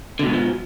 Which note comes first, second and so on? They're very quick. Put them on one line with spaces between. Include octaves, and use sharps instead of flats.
D3 B2 G#2 D#3 F3